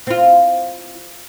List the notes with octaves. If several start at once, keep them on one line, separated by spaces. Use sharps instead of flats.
C4 F4